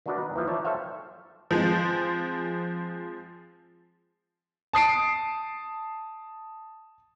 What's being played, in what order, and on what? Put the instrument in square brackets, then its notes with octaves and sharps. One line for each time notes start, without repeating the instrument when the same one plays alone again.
[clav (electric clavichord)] D#3 A3 D4 F#4 B4 D5
B3 D#4 B4
D#2 E3 F3
D#4 C#5 D5 E5 A5
A4 C5 C#5 E5 F5 G5
[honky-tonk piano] F3 G#3 C4
[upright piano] A5 D#6 C7 D7